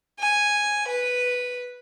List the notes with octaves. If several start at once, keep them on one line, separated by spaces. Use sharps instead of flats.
G#5
B4